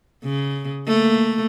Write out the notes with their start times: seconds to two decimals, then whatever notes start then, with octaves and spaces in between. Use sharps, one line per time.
0.24 C#3
0.87 A3 A#3